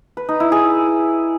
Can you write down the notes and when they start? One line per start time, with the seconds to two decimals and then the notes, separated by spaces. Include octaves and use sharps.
0.17 B4
0.29 D#4
0.40 E4
0.52 G#4